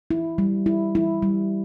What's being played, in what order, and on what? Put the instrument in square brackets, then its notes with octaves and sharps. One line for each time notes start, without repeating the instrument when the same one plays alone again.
[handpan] E4
G3
E4
E4
G3